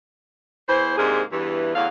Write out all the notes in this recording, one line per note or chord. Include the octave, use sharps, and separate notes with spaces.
E2 E3 C5
G#2 C3 A#3 D4 G#4
E2 G2 E3
E2 A2 F#3 F5